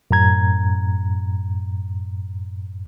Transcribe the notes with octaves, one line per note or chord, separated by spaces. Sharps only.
F#2 A2 A#5 G#6